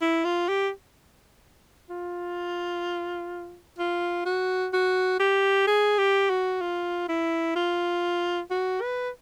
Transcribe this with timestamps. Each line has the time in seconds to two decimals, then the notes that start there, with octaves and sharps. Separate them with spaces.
0.01 E4
0.25 F4
0.48 G4
1.90 F4
3.79 F4
4.25 F#4
4.73 F#4
5.20 G4
5.67 G#4
5.98 G4
6.30 F#4
6.61 F4
7.09 E4
7.55 F4
8.50 F#4
8.81 B4